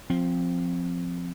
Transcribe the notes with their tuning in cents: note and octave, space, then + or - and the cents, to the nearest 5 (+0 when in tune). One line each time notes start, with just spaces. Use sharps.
F3 +5 C4 +0